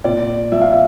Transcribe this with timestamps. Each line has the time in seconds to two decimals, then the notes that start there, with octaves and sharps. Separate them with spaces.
0.04 A#2 D5
0.52 F3 E5
0.61 F5
0.72 E5